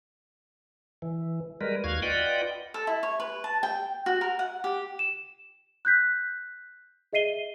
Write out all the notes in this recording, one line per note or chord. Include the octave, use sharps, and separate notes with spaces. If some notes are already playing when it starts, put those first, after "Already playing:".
E3
G3 G#3 A#4 B4
D#2 F#4 F5 G#6
F4 B4 D5 D#5 F#5 G5
A4
E4
C#5
B4
A5
G5
F#4
A#4
F#5
G4
E7
F#6 G6 B6
G#4 D#5 E5 C7 D#7 G7